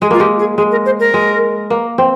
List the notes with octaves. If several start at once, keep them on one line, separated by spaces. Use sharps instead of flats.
G#3 G#4
A#3 F4
G#3 G4
G#4
G#3 G#4
A#4
C5
A#4
G#3
A#3
C4